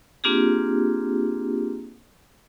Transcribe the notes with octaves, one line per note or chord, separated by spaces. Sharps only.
A#3 C4 D4 F4 G4 G#4